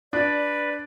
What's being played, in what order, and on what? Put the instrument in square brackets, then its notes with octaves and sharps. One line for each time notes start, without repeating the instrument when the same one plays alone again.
[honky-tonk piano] D4 [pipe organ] B4 [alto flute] D5